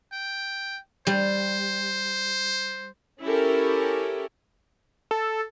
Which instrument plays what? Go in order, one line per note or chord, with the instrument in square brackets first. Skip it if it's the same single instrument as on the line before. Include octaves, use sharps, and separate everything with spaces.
[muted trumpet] G5
[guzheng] G3 [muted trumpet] C5
[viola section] C#4 E4 G4 A4 A#4
[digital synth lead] A4